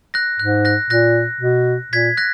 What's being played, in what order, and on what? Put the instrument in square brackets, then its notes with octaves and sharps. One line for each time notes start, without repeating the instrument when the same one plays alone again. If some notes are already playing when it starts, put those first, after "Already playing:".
[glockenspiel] F#6 A#6
[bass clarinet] G#2 [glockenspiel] F#6
[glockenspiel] F#6 A#6
[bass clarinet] A#2 [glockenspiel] F#6 A#6
[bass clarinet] B2
[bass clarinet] A#2 [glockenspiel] G#6 B6
[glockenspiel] F#6 A#6